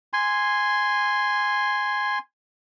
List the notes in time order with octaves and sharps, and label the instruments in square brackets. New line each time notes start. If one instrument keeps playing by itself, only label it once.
[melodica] G#5 C6